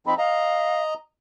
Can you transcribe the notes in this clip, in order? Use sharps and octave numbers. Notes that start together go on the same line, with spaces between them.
F3 C4 D#4 B5
D#5 F5 A#5